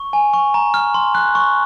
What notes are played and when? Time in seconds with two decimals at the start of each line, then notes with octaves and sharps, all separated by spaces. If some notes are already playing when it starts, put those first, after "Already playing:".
Already playing: C#6
0.13 G#5
0.33 C#6
0.54 A#5
0.74 F6
0.94 C6
1.15 F#6
1.35 C#6